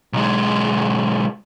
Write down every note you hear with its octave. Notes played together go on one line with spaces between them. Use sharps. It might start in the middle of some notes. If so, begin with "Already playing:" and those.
B1 G#3